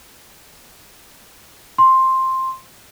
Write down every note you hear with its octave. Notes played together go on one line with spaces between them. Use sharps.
C6